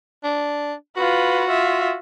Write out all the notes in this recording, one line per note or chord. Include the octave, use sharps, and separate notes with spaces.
D4
F4 F#4 B4
F4 E5